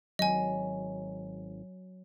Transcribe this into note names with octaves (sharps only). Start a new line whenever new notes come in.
G#1 F#3 D#5 G#5